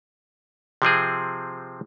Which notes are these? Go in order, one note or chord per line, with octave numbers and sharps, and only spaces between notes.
C3 F3 C4 G#4